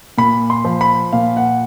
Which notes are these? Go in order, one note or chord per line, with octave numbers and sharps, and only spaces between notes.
A#2 B5
C6
F3
B5
A#2 F5
F#5